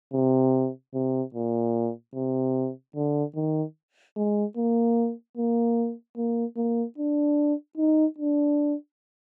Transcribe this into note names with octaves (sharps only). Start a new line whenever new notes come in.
C3
C3
A#2
C3
D3
D#3
G#3
A#3
A#3
A#3
A#3
D4
D#4
D4